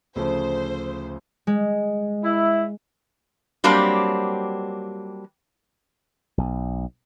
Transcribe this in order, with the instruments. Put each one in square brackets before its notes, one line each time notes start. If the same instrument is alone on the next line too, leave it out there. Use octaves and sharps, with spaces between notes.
[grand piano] D2 C#3 F3 [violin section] C5
[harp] G#3
[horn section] E4
[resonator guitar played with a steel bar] F#3 G3 A#3 C4 D4 G4
[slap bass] B1